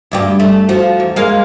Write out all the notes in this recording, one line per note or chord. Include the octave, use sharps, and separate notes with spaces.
D2 G2 G4
A3
F3 F#4
E2
G#3 A#3 F5